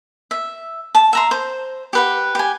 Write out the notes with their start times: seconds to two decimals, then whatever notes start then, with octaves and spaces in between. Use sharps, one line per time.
0.31 E5
0.95 A5
1.13 E5 A#5 C6
1.31 C5
1.93 G4 B4 F#5
2.35 G4 G#5